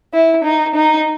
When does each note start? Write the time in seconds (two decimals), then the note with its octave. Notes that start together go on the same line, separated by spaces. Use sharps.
0.13 E4
0.44 D#4
0.75 D#4